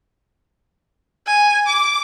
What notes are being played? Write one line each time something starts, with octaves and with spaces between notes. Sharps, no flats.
G#5
D6